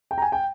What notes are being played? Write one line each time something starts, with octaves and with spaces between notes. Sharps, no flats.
G5
A#5
G#5
G5